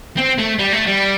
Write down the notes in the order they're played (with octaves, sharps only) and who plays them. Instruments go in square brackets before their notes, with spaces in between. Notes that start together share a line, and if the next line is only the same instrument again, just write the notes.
[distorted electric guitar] C4
A3
G3
A3
G3